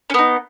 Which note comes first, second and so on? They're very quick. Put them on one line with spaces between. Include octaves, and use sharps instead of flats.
C#4 B3 D#4